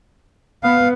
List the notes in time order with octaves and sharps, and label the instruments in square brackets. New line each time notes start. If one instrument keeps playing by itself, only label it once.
[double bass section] B3 [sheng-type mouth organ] F5